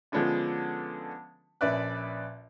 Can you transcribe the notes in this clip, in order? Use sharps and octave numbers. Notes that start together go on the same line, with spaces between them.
D3 F3 G#3 B3 C#4 D4
A#1 C#4 B4 D5 E5 F#6